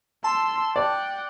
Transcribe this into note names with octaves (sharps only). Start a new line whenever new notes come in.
A5 C6 E6
D5 F#5 G5